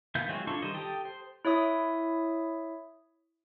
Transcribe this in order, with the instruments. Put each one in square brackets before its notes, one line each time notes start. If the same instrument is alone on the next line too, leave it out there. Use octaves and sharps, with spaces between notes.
[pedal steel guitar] D#3 B3 E5 F5 G6
F#3 G#3 C4 F4 F#4
D4 E4 F4 A4 C#6
D#3 G3 C5 D#5
G4 A4 G5 D#6
C5
[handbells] E4 C#5 E5 D#6